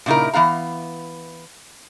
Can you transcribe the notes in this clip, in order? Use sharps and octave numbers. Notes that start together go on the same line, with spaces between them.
A#2 C#3 D#4 E4 A#4
E3 B3 F5 A#5